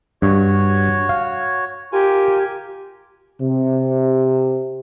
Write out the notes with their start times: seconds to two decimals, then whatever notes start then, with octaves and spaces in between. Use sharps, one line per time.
0.22 G2 F#4 C#5
1.09 F5
1.93 F4 G4 A#4 G#5
3.41 C3